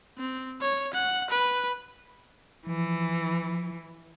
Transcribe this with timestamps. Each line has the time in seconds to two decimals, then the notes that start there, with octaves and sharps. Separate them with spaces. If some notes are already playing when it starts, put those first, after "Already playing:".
0.18 C4
0.61 C#5
0.94 F#5
1.31 B4
2.67 E3 F3